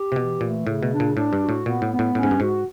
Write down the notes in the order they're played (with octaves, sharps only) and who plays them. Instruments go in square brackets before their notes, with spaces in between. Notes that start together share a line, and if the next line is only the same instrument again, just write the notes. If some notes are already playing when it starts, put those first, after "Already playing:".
Already playing: [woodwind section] G4
[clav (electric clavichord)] C3
[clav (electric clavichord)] B2 [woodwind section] E3
[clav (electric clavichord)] A#2 [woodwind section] A3
[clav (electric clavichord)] A2 [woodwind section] C#3
[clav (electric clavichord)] B2
[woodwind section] D4
[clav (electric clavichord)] A#2
[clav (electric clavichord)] A2 [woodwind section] D4
[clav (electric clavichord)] G2
[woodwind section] F#4
[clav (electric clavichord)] A2
[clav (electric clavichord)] A#2 [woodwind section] B3
[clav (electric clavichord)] A2
[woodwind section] B3
[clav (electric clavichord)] A2
[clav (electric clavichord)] A2 [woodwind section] C#4
[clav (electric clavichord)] G#2
G2
[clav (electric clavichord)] G#2 [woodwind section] F#4